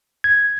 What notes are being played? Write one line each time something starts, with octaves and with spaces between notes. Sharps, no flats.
G#6